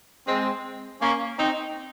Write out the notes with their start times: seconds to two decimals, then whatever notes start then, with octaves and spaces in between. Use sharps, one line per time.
0.27 G#3 C4
1.01 A#3 C#4
1.38 C4 D#4